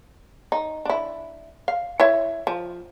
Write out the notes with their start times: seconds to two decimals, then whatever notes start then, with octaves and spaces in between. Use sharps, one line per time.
0.52 D#4
0.85 D4 E4
1.68 F5
2.00 E4 C#5 E5
2.47 F3